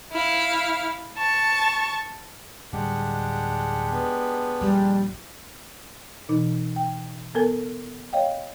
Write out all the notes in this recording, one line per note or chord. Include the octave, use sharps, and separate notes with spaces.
E4 F5
A5 C#6
D1 G3 G#3 D4 G4 F#5
B3
A#1 D#2 G3
B2 E3 D#4
G5
B3 A4 A#4 G#5
C#5 D#5 F5 G5